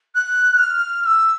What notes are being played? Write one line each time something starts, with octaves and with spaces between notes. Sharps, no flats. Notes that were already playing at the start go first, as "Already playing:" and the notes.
F#6
F6
F6
E6